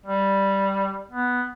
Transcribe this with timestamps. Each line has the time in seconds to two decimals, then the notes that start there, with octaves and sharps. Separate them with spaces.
0.06 G3
1.11 B3